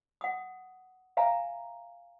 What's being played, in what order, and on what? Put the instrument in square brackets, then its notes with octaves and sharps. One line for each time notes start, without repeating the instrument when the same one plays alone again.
[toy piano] F#5 D#6
E5 F5 G#5 A#5